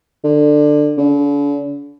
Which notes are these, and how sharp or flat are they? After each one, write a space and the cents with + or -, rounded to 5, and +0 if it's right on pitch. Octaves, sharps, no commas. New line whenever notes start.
D3 +15
D3 -45